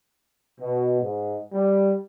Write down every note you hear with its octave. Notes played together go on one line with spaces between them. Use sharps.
B2
G#2
G3